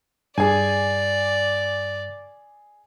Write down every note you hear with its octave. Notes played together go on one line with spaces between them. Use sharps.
G2 G#4 D5 G#5